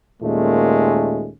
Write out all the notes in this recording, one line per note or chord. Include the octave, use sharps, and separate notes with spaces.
D#2 A#2 G#3 A3 C#4